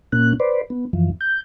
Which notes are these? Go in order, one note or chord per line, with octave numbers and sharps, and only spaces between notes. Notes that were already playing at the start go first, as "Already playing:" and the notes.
A#2 A#3 C#4 F#6
B4 C5 D5
B3
F#2 E3 F3
G6